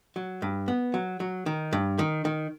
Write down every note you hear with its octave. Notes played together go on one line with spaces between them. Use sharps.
F#3
G2
B3
F#3
F#3
D#3
G2
D#3
D#3